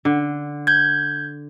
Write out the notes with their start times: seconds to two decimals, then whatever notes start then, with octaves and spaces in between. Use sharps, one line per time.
0.05 D3
0.67 G6 G#6